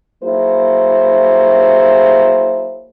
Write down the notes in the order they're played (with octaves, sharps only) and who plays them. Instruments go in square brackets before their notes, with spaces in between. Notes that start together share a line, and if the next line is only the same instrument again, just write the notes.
[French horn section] F#3 A#3 E4 G#4 C5